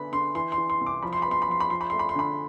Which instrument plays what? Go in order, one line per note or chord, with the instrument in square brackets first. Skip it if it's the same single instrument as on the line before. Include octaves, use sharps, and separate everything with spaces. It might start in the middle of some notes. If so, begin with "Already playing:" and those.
Already playing: [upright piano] D3 B3 B5
D3 C6
E3 C6
C6
E3
C6
C2
D6
F3 B5
C6
B3 B5
C6
B5
F3 C6
B5
F3 C6
B5
A3 C6
B5
C6
D3 B5